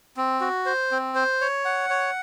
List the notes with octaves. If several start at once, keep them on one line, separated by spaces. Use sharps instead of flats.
C4
F#4
C5
C4
C5
C#5
F#5
C#5